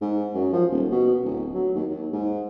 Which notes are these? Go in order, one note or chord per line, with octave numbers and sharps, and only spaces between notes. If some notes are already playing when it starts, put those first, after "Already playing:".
G#2
F#2
F3
D#1
B2
D1
F#3
D#2
D#2
G#2